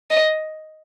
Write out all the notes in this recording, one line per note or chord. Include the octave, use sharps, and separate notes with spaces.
D#5